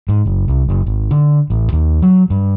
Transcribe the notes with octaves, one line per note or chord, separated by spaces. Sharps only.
G#2
F#1
C2
F#1
G#1
D3
A1
D#2
F#3
G2